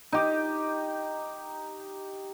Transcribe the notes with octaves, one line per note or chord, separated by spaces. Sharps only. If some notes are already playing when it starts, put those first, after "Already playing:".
D#4 G4